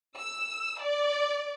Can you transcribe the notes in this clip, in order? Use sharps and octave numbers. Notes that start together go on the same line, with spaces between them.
E6
D5